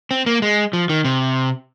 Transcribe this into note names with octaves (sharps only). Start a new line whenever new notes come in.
C4
A#3
G#3
F3
D#3
C3